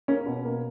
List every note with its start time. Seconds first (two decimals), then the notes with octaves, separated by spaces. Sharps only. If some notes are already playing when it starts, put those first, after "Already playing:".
0.08 A#3 C#4
0.26 B2
0.44 A#3